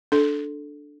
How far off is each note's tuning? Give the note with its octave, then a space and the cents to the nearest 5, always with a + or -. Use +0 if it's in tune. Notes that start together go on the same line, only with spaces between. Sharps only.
D4 +0 A4 -10